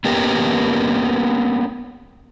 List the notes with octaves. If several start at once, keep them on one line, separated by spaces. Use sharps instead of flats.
A#3 B3 C#4 G4 A#4